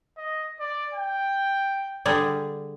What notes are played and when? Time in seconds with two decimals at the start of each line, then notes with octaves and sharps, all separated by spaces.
0.18 D#5
0.60 D5
0.94 G5
2.06 D3 G3 G#4